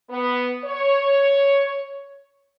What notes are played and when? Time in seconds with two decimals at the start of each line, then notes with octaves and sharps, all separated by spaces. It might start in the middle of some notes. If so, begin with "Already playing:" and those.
0.10 B3
0.64 C#5